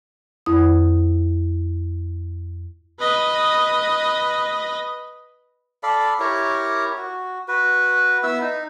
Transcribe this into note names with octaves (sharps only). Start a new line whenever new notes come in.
F2 E4 D#6
B4 D#5
A4 D5 F5 B5
E4 G4 A#4 C#5
F#4
F#4 B4
B3 E4 E5 E6
D#4